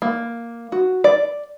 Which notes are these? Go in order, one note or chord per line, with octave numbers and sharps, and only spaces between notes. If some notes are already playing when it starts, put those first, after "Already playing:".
A#3
F#4
D5